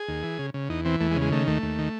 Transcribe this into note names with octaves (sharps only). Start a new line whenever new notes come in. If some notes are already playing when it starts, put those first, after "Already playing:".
Already playing: G#4
D#2
E3
C#3
C#3
E2 D#4
E3 C4
E2 A3
G#3
C#3
G#3
D#3 A3
D#2 A3
D#2
D#3